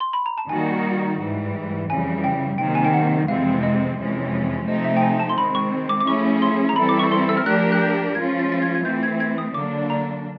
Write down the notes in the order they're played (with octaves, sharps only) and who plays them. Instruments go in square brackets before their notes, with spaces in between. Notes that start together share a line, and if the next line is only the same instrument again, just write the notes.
[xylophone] C6
B5
A#5
A5
[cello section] D#3 G3 A#3 D#4 F#4 [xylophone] G#5
[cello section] G#2 E3 G3
[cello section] F2 C#3 E3 G3 [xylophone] G#5
[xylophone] G5
[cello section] C3 D#3 F#3 A#3 [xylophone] G5
[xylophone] G#5
G5
F#5
[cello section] F2 C3 E3 G#3 C4 [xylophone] F5
[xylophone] D#5
[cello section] F2 C3 E3 G#3 C#4
[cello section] C3 F3 A3 C4 D#4 [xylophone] D#5
[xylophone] E5
G5
G#5
A5
C6
[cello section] D#3 G#3 C4 [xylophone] B5
[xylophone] C#6
D6
D6
[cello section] F3 A3 C#4 E4 G#4 [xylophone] C#6
[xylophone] C6
A#5
[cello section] E3 G3 C4 E4 A4 [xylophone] B5
[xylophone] D6
C#6
C6
E6
F6
[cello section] F3 A3 D4 G4 A#4 [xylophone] F#6
[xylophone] F#6
G6
[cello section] F3 G#3 C#4 F4 [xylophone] G#6
[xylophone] A6
A6
G#6
G#6
[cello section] E3 A3 C4 [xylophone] G6
[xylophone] G#6
G#6
D#6
[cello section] D3 F#3 A#3 D4 [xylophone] D6
[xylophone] A#5